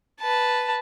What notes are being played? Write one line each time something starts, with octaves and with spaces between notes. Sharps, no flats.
B4 A5